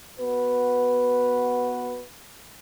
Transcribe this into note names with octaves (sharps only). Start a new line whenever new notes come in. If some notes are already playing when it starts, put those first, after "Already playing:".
B3 F#4 B4